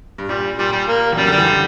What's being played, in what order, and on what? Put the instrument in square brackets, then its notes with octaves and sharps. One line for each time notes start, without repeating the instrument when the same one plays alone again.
[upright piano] G2
[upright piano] A#2 [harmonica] G3
[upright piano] A#2 [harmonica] G3
[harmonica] G3
A#3
[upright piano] E2
[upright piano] F#2 [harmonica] G3
[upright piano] D3
[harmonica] G3
[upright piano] E3
D3